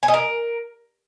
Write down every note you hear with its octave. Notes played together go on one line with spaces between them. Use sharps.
G#5
D#5
A#4